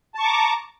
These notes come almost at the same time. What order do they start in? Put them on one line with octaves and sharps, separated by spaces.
A5 C#6 D6 A#5